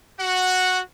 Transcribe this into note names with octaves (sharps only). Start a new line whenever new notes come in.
F#4 F#5